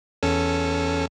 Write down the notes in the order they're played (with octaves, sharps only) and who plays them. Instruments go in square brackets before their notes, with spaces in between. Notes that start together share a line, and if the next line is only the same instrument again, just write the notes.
[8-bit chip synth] E2 C#4 A4